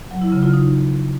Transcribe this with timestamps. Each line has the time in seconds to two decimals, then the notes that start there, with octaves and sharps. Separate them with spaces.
0.11 F#3
0.22 E4
0.32 C#3
0.43 F4
0.53 D#4